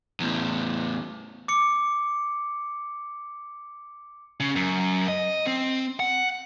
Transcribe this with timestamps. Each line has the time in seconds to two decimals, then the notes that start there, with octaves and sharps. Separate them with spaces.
0.20 E2 A2
1.48 D6 C#7
4.40 C#3
4.56 F#2
5.08 D#5
5.46 C4
6.00 F#5